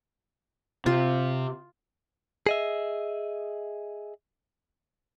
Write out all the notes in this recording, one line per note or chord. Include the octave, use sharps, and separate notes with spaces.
C3 F4
G#4 D#5 E5